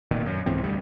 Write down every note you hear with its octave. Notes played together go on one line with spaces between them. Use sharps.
F1 A#2 D#3
F#2
C2 G#2 E3 C4
D2 G3